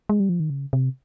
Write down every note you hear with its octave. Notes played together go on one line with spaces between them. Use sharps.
G#3
G3
F3
D#3
C#3
C3